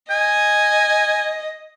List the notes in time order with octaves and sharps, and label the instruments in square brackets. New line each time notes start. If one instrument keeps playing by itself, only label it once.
[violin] D#5 [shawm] G#5